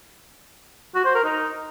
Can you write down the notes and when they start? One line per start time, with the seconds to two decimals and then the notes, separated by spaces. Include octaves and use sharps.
0.95 F#4
1.05 C5
1.15 A#4
1.24 D#4